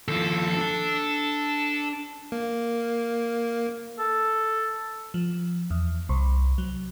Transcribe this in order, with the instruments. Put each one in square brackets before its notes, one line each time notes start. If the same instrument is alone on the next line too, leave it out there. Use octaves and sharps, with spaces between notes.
[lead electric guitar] D#2 F3 [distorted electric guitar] A4
[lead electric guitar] D4 A5
[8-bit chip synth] A#3
[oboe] A4
[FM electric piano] F3
E2
C2
F#3